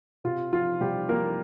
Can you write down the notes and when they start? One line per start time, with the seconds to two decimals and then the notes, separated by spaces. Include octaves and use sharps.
0.24 C3 F4
0.53 F3 F4
0.80 C3 G3 G4
1.09 F3 A#3 A#4